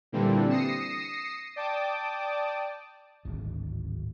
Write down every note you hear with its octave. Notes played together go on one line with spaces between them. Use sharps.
A#2 D3 E3 G3 C4 D4
D#6 A#6 C7 C#7 E7
D5 G5 A5 D6 D#6
D1 G#1